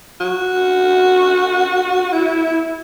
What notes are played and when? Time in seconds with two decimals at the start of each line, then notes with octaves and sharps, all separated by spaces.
0.20 F#4
2.12 E4